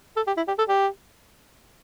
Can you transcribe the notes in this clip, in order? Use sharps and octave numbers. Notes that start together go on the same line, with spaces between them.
A4
G4
E4
G4
A4
G4